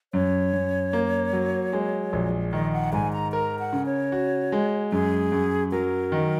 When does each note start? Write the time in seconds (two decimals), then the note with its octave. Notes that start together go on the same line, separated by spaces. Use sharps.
0.13 F#2 C#5
0.53 F#2
0.93 A#3
1.33 F#3
1.73 G#3
2.13 A#1
2.53 D#3 D#5
2.73 F#5
2.93 G#2 G#5
3.13 A#5
3.32 A#4 A#5
3.59 F#5
3.73 C#3
3.86 C#5
4.12 F#4
4.52 G#3
4.92 F#2 G#4
5.32 F#2
5.71 F#3 A#4
6.12 D#3